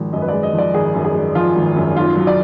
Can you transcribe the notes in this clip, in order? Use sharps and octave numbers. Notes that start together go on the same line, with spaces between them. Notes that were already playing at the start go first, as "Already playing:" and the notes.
Already playing: G#1 F3 G#3
F#2 D#5
B4
G#3 D5
D#5
F3 D5
G#1 G#4
F#2
G#4
G#3
F3 F4
G#1
F#2
B1 F4
F#3
D5